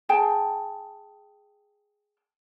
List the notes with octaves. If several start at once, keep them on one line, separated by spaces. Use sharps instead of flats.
G#4 G5 A5